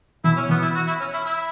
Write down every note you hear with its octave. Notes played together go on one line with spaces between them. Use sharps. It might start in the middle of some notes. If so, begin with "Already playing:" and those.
B2 E3 E4
C#4
B2 E3 B3
E4
F#4
E4
C#4
E4
E4